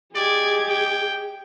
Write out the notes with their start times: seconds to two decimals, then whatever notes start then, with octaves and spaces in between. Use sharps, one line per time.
0.15 G4 G#4 D5 D#5 D6 G#6
0.69 G5